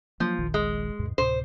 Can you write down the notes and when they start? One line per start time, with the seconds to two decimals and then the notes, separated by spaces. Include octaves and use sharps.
0.20 F3 F#3 A#3
0.39 D#1 A#1 D#3
0.54 G#3
0.99 D2 G2 B2
1.18 D2 A2 C3 C5